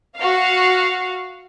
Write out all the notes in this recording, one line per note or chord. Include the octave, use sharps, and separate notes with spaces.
F#4 F5